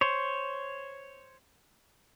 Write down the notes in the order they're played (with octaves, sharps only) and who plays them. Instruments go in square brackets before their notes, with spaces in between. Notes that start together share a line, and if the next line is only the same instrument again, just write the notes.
[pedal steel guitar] C5 C#5